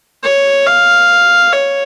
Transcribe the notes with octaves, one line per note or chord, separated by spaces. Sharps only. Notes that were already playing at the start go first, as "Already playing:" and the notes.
C#5
F5
C#5